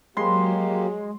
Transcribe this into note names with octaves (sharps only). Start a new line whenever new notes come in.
F#3 G#3 A#3 G4 C6